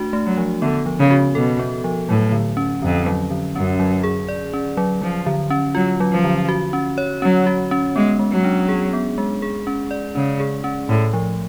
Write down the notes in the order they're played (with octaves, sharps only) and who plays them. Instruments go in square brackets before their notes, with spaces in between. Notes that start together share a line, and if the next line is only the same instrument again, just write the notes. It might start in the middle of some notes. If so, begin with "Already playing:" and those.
Already playing: [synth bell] A3 D4 F#4
A3
[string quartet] F#3
[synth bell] F3
[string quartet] D3 [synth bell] B3
[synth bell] F3
[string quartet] C#3
[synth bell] F#4
[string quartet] B2 [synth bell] A4
[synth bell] B3
F3
[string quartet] A2 [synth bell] F#3
[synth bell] D3
C#4
[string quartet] F2 [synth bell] D3
[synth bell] F#3
D3
[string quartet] F#2 [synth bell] C#4
[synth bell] F#3
G#4
D5
C#4
F#3
[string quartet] F3 [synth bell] F#3
[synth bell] D3
C#4
[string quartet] F#3 [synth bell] F4
[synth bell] F#3
[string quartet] F3
[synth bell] D3
F#4
C#4
C#5
[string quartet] F#3 [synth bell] C#4
[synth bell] F#4
C#4
[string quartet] G#3 [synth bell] B3
[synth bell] G#3
[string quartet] F#3
[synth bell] D4
G#4
B3
G#3
G#4
C#4
D5
[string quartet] C#3 [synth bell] C#4
[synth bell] G#4
C#4
[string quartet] A2 [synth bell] A3
[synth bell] F3